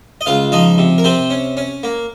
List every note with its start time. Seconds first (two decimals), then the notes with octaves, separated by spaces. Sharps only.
0.21 D#5
0.26 C#2 F4 F5
0.52 F3 D#4 D#5
0.78 C3
0.98 A#4
1.04 C3 C4 C5
1.30 C#4
1.57 C#4
1.83 A#3